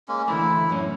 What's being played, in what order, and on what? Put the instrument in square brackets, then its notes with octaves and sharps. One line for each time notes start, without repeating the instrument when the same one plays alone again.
[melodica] G#3 A#3 C#4
[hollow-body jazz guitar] D3 E3 A3 [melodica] E4
[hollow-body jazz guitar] F#2 A2 C#4